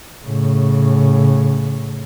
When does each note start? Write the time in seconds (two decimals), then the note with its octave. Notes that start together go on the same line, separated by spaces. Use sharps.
0.25 A2 C#3